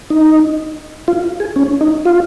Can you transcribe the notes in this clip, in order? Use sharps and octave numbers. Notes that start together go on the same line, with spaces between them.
D#4
F4
G#4
C#4
D#4
F4